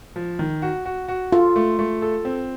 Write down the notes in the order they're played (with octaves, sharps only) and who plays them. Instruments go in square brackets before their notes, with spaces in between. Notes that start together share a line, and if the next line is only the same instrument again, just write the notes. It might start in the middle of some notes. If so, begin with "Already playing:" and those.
[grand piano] F3
D#3
F#4
F#4
F#4
[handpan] F4 [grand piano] A4
[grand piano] A3
A3
A4
C4